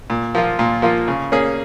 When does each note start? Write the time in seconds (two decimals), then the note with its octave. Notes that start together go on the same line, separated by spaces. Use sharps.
0.10 A#2
0.35 F3 A#3 F4
0.59 A#2
0.82 F3 A#3 F4
1.08 C#3
1.32 A#3 C#4 G#4